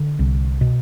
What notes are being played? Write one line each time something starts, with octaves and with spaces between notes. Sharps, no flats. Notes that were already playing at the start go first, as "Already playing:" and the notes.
Already playing: D3
C2
B2